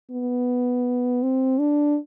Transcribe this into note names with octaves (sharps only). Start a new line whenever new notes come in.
B3
C4
D4